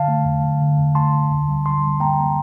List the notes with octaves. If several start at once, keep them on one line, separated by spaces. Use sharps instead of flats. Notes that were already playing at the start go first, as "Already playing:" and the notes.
Already playing: D3 F5 A5
A3
E2
D3
D3
E2
A3 A5 C6
D3
D2
G3
D3 A5 C6
G3
A#3 G5 A#5
A#3